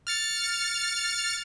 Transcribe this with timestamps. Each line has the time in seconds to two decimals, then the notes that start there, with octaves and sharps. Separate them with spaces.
0.07 F6 A6 C#7